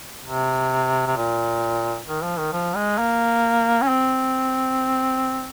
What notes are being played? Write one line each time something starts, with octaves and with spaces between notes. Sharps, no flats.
C3
C3
A#2
D#3
F3
D#3
F3
G#3
A#3
C#4
C4